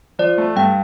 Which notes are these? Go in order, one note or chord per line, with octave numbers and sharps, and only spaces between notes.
F3 D5
A3
G2 G5